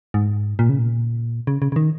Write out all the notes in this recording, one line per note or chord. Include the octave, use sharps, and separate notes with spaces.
G#2
A#2
C#3
A#2
C#3
C#3
C#3
D#3